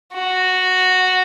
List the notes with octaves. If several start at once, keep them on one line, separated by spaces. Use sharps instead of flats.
F#4